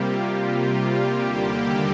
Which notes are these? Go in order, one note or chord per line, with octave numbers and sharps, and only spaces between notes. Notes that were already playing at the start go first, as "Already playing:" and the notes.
Already playing: C3 G3 A#3 F4 G4
F4
D#2 D3 G3 A#3 G4